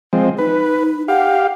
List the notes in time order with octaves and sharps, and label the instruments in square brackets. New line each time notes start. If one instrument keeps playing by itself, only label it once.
[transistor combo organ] F3 G#3 C4
[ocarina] D#4 [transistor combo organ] B4
[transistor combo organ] G4 F5 [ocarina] F#5